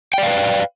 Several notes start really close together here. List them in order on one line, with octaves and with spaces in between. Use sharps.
G5 D5 F5 B4